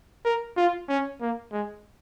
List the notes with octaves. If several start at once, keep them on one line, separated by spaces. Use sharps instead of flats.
A#4
F4
C#4
A#3
G#3